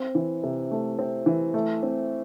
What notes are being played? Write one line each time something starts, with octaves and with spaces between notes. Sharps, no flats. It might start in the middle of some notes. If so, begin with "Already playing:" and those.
Already playing: C4
E3
C3
A3
C4
E3
A3
C4